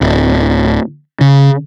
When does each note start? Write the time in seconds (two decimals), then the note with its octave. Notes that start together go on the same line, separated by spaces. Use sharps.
0.01 D1
1.21 C#3